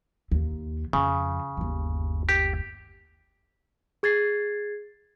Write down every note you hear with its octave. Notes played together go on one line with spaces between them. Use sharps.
D#2
F2 C#3
G1 D#2
G4
G#4 G#6 A6 C7